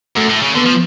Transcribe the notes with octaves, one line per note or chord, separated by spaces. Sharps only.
F#2 A3
A2
C#3
D3 B3
F3